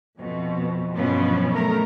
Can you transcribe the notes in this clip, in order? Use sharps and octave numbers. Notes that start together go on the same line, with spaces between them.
F2 B2 E3
G2 B2 F3 F#3 B3 C#4
A3 A#4